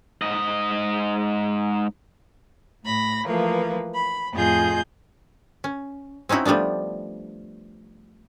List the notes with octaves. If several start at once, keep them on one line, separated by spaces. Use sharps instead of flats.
G#2 D#5
A2 B5 A#6
E3 F3 A3 A#3 B4
B5
F2 A2 F4 G#4 D#5 G6
C#4
C4 C#4 D#4 E4 F#4
F3 G3 A3 B3 D4